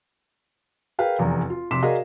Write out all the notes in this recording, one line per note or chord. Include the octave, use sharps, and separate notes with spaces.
G#4 A#4 B4 F5 G5
F1 E2 A#5
F4
F1 C3 C6 D6 B6 E7
F#4 G#4 A#4 D5 D#5 F5